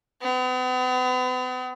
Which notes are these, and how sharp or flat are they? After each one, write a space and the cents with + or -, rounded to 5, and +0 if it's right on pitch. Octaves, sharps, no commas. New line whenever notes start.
B3 +40